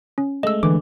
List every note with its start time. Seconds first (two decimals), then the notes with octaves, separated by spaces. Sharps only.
0.18 C#4
0.43 G#3 A3 D#5 E6
0.63 D3 E3 D6